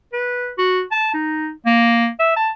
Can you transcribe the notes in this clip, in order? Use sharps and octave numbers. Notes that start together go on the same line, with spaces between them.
B4
F#4
A5
D#4
A#3
E5
A5